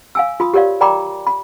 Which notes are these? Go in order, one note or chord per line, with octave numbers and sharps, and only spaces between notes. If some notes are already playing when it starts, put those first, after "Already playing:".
F5 G#5 E6
F4 B5 D#6
G4 A#4 C#5 D5 F5
A#4 D5 G5 A#5 B5 D6
B5